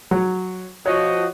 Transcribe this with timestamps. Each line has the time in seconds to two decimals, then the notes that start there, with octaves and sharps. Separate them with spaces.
0.11 F#3
0.86 F3 F#4 C#5 D#5